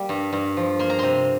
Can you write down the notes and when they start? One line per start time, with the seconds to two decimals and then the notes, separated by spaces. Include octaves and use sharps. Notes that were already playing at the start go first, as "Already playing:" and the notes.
Already playing: G3 A#3
0.09 G2
0.33 G2
0.57 F3
0.79 A#3 C6
0.90 A#5
0.99 C3 C6